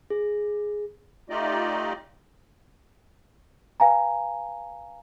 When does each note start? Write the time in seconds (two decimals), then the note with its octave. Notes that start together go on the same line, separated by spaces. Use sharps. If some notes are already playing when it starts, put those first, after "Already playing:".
0.10 G#4
1.30 A3 D#4 F4 G4 D5 D#5
3.80 B4 F5 G#5 A#5